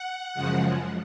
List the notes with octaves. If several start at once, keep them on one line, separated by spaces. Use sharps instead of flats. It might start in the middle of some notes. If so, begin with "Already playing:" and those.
Already playing: F#5
F#2 C#3 F3 G#3